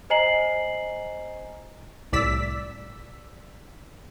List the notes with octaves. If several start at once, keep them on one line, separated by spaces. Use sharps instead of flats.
C5 D#5 G#5 A#5 C7 F#7
C2 A2 D5 E6 B6